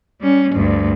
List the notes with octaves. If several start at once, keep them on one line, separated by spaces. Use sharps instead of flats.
G3 C#4
D2 G2